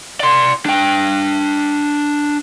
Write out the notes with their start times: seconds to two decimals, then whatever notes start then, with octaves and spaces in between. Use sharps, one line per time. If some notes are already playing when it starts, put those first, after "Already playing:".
0.20 D5 C6
0.66 D4 G5